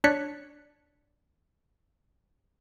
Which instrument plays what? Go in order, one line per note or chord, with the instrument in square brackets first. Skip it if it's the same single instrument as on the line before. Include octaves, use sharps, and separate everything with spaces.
[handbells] D4 C#5 D5 F#6 B6 C#7